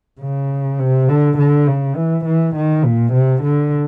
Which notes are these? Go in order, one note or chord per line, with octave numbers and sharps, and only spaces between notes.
C#3
C3
D3
D3
C#3
E3
E3
D#3
A#2
C3
D3